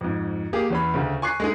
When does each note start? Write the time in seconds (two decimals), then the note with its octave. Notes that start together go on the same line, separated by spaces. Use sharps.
0.01 F2 G#2
0.53 A#3 G4 G#4
0.70 E2 C#4 B5
0.94 D2 C#3
1.22 G#5 C#6 F#6 C7
1.40 G#3 A3 D#4 G#4